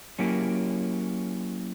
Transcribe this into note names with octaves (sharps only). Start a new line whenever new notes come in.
F#3 A#3 C#4 E4 G4